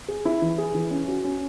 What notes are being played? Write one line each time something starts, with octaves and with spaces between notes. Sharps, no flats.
G#4
E4
E3
G#4
E3
C#4
F#4
C#4